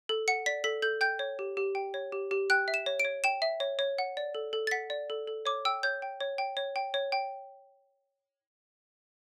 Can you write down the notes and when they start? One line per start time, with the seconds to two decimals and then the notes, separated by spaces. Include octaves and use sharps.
0.09 A4
0.28 F#5 C#7
0.46 D5 B6
0.64 A4 B6
0.82 A4 G6
1.01 G5 G6
1.19 C#5
1.39 G4
1.57 G4
1.75 G5
1.94 C#5
2.12 G4
2.31 G4
2.50 G5 F#6
2.68 E5
2.74 E7
2.86 C#5
3.00 D7
3.05 C#5
3.24 G5 E7
3.42 E5
3.60 C#5
3.79 C#5
3.98 F#5
4.17 D5
4.35 A4
4.53 A4
4.67 A6
4.71 F#5 B6
4.90 D5
5.10 A4
5.27 A4
5.46 C#5 D6
5.65 G5 E6
5.83 C#5 G6
6.02 G5
6.21 C#5
6.38 G5
6.57 C#5
6.76 G5
6.94 C#5
7.12 G5